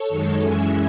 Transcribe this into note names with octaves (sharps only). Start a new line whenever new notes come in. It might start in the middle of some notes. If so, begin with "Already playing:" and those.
Already playing: A4 C#5
F#2 D#3 G#3
F#2 E3 G#3 C#4 E5 G#5